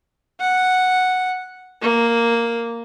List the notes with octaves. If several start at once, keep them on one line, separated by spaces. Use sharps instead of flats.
F#5
A#3